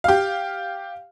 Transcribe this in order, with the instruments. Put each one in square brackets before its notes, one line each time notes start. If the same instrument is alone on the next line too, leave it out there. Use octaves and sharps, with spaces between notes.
[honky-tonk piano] G4 F5